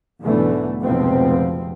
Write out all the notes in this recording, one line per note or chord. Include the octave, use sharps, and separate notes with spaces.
B1 G#2 B2 D3 E3 A3
F1 C#2 B2 F3 C4